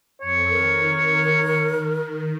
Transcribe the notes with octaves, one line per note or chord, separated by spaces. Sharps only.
F2 C4 A4 C#5
D#3 A#4